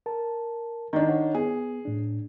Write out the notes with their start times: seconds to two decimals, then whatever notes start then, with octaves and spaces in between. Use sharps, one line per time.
0.06 A#4 A5
0.93 D#3 D4 A#5
1.08 C#5 F#5
1.34 B3 G#4
1.85 A2 D4